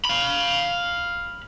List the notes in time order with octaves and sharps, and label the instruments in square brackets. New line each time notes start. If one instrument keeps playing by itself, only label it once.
[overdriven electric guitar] F5 B5